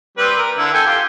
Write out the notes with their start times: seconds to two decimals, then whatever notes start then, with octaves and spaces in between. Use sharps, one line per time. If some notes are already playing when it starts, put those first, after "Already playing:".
0.18 G3 C4 B4
0.38 A#4
0.58 D3 E4
0.73 A4 G5 G#5
0.86 F4 G4